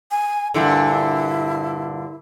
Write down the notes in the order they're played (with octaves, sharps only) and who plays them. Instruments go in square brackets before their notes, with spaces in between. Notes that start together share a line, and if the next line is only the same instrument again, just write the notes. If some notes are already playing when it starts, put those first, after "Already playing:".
[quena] G#5
[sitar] G2 A#2 D3 [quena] E4